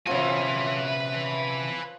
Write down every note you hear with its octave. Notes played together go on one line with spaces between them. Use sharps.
C3 F3 C#4 F#4 B4 C#5 E5 G#5